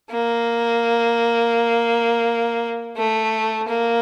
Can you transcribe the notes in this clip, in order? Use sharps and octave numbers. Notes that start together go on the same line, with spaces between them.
A#3
A3
A#3